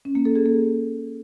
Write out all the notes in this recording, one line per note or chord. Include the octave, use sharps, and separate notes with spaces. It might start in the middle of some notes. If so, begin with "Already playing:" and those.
C#4
A#3
A4
G#4
A#3